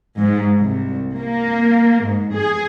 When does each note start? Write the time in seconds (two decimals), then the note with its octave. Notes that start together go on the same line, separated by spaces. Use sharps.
0.19 G#2
0.58 C2
1.15 A#3
2.04 G#2
2.34 G#4